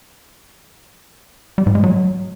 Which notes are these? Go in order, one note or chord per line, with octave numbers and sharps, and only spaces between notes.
G3
G#2
G#3
F#3